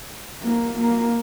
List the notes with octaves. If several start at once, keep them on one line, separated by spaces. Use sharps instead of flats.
A#3
A#3